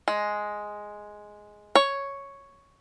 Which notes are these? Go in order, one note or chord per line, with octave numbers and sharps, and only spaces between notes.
G#3
C#5